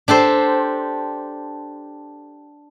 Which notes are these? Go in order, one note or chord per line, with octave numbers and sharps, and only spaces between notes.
D4 G4 A4 C5